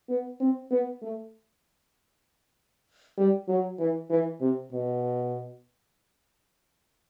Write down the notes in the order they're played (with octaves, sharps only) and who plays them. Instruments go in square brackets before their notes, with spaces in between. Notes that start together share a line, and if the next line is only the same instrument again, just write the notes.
[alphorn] B3
C4
B3
A3
G3
F#3
E3
E3
C3
B2